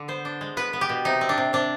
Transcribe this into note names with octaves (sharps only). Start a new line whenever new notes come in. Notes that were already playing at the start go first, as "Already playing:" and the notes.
Already playing: D3
B3 C5
D4
G#3
B3 B4
B3
G4
B2
C3 D#4
C4
D4
C3
C3 D4